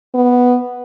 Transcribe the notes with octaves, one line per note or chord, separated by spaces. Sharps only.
B3